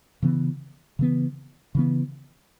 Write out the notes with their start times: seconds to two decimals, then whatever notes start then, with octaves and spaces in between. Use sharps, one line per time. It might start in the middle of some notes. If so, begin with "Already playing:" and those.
0.22 C#3 E3 B3
0.99 C#3 E3 B3
1.75 C#3 E3 B3